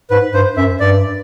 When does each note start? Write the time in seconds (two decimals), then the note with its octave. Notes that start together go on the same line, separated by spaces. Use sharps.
0.10 G#2 B4
0.34 G2 C5
0.57 F#2 E5
0.79 G2 D5